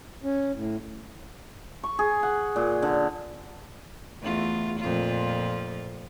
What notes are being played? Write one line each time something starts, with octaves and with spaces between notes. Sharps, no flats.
C#4
A2
C#6
G#4
F#5
A#2
D3
E2 A3 F4
F2 A#2 F4